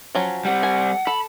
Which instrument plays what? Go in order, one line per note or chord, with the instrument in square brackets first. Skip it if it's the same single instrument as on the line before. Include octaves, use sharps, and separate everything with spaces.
[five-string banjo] F3 F#3 C#4
[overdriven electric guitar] G3 C4 [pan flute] F#5
[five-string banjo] G#5
[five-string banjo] A4 [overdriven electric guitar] B5